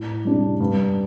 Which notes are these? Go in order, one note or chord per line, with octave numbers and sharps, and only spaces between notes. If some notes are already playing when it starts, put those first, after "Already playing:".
Already playing: A2
G3 D4
G2